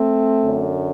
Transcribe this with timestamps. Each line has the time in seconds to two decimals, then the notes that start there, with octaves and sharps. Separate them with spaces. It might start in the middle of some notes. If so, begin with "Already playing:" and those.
Already playing: A3 C4
0.42 F#2 D3